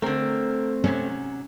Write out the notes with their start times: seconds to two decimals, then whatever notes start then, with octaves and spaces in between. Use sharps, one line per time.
0.02 D3 A3 C4 A#4
0.84 G#2 C3 F#3 C#4